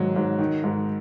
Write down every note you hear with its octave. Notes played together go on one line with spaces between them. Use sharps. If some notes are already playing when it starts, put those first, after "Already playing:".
Already playing: G#2 D#3 F#3
G#2
D#3
G#2